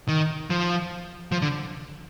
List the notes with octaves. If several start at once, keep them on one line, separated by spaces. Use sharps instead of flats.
D#3
F3
F3
D3